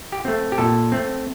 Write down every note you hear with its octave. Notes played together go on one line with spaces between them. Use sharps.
G4
A3 C4
G4
A#2 A4
A3 C4